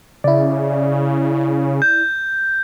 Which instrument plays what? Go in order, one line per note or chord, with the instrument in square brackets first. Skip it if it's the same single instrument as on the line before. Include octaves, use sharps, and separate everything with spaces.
[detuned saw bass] C#3 [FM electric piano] E4 D5
[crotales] G6